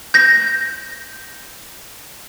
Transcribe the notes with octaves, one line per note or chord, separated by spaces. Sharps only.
G6 A#6